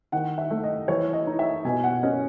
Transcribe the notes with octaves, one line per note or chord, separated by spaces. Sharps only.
D#3 F#5
E5
A3
D#5
E3 C#5
D#5
D#4
E5
B2 G#5
F#5
C#4 D#5